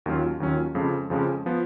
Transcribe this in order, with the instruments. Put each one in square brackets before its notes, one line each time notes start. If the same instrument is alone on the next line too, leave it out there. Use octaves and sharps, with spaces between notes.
[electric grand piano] D#2 D#3 F#3 C#4 F4
D#2 D#3 F#3 C#4 F4
F2 C#3 F3 G#3 C#4
F2 C#3 F3 G#3 C#4
F3 B3